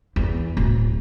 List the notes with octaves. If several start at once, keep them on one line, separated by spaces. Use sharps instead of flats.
E2
D1